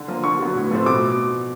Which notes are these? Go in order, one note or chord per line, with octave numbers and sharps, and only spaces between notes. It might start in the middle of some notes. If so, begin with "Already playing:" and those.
Already playing: D3
F3 A#3
D3 C#6
F#3 B3
A2
F3 A3 C4
B2 D6